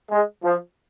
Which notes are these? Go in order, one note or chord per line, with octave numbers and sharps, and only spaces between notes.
G#3
F3